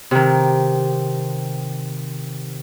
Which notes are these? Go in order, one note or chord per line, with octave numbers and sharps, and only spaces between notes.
C3 D#3